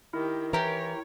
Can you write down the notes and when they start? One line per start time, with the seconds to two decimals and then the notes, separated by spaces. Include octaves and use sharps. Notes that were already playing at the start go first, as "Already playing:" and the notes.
0.13 D#3 E4 G4
0.53 E3 G4 A#4 C#5